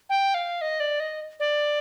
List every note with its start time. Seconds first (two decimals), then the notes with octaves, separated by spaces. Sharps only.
0.09 G5
0.34 F5
0.61 D#5
0.80 D5
1.00 D#5
1.40 D5